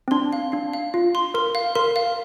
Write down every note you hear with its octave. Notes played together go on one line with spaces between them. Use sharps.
C4
D4 C6
F5
D4 F5
F5
F4 F5
C6
A#4 C6
F5
A#4 C6
F5